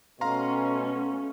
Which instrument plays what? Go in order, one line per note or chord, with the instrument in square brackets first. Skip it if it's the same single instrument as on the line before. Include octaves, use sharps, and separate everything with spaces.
[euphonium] B2 [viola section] A3 C#4 [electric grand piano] F5 A#5 C6